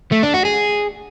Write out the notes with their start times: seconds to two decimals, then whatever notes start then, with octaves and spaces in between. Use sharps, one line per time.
0.12 A3
0.23 D4
0.34 F#4
0.45 G#4